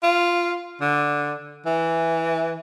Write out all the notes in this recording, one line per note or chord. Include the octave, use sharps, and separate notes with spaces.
F4
D3
E3